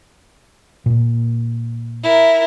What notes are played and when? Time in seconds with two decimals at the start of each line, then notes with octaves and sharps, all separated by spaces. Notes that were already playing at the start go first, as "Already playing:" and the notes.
0.86 A#2 A#3
2.03 E4 A#4